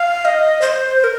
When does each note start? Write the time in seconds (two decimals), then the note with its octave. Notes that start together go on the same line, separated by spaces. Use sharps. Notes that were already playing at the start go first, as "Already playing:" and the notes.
Already playing: F5
0.25 D#5
0.62 C5
1.00 C5
1.04 A#4